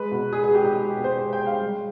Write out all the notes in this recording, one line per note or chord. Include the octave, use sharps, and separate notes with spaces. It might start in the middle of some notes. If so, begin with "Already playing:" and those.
Already playing: G#3 B4
B2
G#3 G#4
G#4
G#3 G4
G4
G#3
B2
C5
G#3 C5
G5
G#3
F5
G3